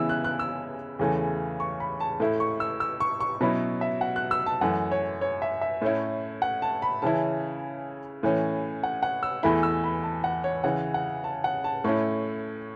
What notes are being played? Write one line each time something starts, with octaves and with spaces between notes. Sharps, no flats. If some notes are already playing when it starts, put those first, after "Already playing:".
Already playing: C#3 E3 B3 E4 E6
F#6
F#6
E6
E2 C#3 E3 A3
C#6
B5
A5
A2 A3 E4
C#6
E6
E6
C#6
C#6
B2 F#3 C#4 E4 B5
E5
F#5
F#6
E6
A5
F#2 E3 A3 F#5
C#5
C#5
E5
E5
A2 A3 C#4 E4
F#5
A5
B5
C#3 E3 C#4 E4 A5
A2 E3 C#4
F#5
F#5
E6
E2 E3 A3 E4 B5
E6
B5
A5
F#5
C#5
C#3 E3 C#4 F#5
F#5
A5
F#5
A5
A2 A3 C#4 E4 C#6